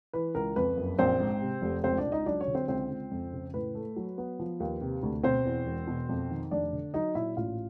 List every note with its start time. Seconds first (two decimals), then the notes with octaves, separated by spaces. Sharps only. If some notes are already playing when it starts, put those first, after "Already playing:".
0.13 E3 B4
0.35 C#2 A#4
0.56 F2 B4
0.77 F#1
0.99 A#1 C4 C5
1.20 G#2
1.41 C3
1.62 F1
1.84 C#2 C4 C5
1.98 D4 D5
2.05 C#2
2.12 D#4 D#5
2.26 F#3 D4 D5
2.40 C#4 C#5
2.48 D3
2.55 C4 C5
2.68 C#2 C4 C5
2.90 C#2
3.11 F2
3.33 C#3
3.54 A2 B4
3.75 A3
3.96 F#3
4.18 B3
4.39 F3
4.60 D#2
4.81 C3
5.03 D2
5.23 B2 C4 C5
5.45 E2
5.66 E1
5.87 B2
6.09 F2
6.30 D#3
6.51 F1 D4 D5
6.73 D3
6.94 F#3 D#4 D#5
7.15 A#2 E4 E5
7.36 A1 F4 F5